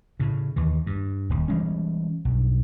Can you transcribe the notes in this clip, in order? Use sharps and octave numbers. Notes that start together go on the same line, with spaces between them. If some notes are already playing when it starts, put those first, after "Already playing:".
A2 C#3
D#2 E3
G2
D#1 D#2
E3 G3 G#3 C#4
B1 G2